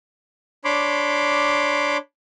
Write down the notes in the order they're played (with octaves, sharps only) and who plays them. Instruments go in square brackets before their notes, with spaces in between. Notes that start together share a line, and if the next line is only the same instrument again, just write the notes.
[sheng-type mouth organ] D4 C#5 B5 C6 D6